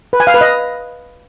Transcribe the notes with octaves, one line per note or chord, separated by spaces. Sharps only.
B4
G#5
F5
B4
D#5